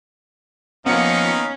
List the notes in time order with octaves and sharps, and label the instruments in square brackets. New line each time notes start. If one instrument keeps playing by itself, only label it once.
[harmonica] D#3 D#4 F5 [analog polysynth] F3 C#7 [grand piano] A#3 B3 [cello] C#4